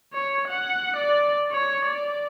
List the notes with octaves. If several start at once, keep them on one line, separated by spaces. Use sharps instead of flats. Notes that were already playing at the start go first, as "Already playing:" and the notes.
C#5
F#5
D5
C#5
D5